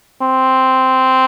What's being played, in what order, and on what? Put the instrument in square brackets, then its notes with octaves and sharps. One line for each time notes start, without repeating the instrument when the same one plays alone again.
[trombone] C4